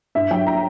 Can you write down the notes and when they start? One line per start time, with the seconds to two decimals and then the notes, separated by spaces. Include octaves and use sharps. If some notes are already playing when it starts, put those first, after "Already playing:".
0.15 G2 E5
0.31 F#3 G5
0.47 A#5